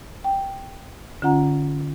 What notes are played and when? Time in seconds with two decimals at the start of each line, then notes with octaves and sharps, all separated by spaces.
0.24 G5
1.22 D3 C#4 F4 F#5 A#5